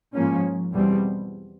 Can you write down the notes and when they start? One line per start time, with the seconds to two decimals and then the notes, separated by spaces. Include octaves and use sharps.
0.14 G#2 F3 A#3 C#4
0.73 E2 B2 G3 C4